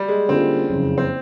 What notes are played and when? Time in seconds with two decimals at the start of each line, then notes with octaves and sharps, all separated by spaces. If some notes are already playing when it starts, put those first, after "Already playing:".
Already playing: G3
0.08 G#3
0.28 D3 G3 A#3 C4 C#4 F4
0.69 F#1 F2 C#3
0.98 C4